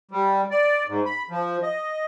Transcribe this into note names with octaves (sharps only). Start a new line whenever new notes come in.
G3
D5
G#2
B5
F3
D#5